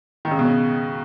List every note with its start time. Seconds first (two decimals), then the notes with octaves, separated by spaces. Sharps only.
0.25 D#3
0.31 C#3
0.39 B2
0.45 C#3